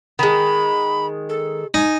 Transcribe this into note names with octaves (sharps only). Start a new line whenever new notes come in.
D#3 G#3 B5
A4
D#4 G#5